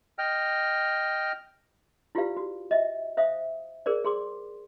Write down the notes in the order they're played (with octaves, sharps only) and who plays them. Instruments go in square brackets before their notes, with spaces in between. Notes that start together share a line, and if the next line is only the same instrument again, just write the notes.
[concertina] D#5 G5 F6
[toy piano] E4 F4 G4 B4 D5 F5
F#4
D#5 E5
C5 E5 F5 D#6
G#4 A#4 C5 D5
G#4 C6 D6